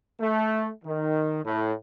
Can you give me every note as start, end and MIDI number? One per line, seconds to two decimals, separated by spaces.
0.21 0.69 57
0.84 1.41 51
1.44 1.73 45